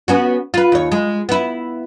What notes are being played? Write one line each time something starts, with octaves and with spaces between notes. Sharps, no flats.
B3 C#4 F#4
F4 B4
D#2 C#5
G#3
B3 E4